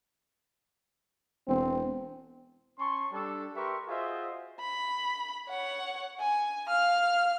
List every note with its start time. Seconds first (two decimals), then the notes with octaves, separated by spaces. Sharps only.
1.48 E1 C4
2.79 C#4 A5 C6 C#6
3.12 G3 D4 A4
3.56 G4 A#4 B4 E5 C6 C#6
3.88 F4 F#4 G#4 C5 D#5 E5
4.60 B5
5.49 C#5 F#5
6.20 G#5
6.68 F5 F6